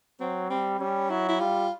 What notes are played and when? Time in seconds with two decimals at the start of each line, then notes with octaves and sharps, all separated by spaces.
0.20 F#3 C4
0.50 G3 C4
0.79 G3 C#4
1.10 F#3 E4
1.29 E4
1.40 G3 F4